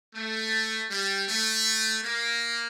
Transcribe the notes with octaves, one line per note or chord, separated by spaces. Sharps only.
A3
G3
A3
A#3